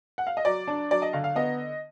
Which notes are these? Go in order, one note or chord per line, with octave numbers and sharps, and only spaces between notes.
F#5
F5
D#5
F#3 D5
D4
F#3 D5
D#5
D3 F5
F5
B3 D#5